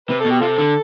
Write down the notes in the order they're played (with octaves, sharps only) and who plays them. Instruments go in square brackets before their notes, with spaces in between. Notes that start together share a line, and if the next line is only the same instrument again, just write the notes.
[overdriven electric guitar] C3 [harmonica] B4
[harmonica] A4
[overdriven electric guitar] B2
[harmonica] G4
[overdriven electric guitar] C3 [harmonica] F4 A4
[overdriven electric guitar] D3